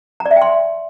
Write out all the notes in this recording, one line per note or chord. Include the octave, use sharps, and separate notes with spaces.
A#5
D5
E5
G5
C6